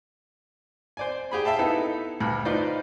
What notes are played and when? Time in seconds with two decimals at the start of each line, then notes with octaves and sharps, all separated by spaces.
0.97 C5 D5 G#5
1.31 G4 G#4 B5
1.45 E5 F5 G5 A5
1.59 B3 D#4 E4 A4
2.20 D2 G2
2.45 D#4 F4 B4 C5 D5